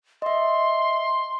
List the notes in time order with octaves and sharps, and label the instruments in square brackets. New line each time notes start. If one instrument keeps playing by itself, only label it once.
[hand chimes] D#5 E5 [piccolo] C6